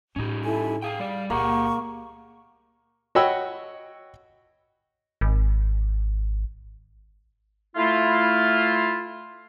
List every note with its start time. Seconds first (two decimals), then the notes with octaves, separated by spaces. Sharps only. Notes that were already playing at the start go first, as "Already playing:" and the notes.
0.16 A2 C#4 D#4 F4 G4
0.44 E4 A4 G#5
0.82 G#4 F5 G5
0.99 G3 D5
1.30 C#2 A#2 A#3 G4 G#4 F#5 C#6
3.15 F#4 C#5 D#5 G5 B5 E6
5.21 G#1
7.76 A3 E4 F4